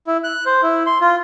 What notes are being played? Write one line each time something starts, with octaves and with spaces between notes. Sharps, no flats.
E4
F#6
C5
E4
C6
F4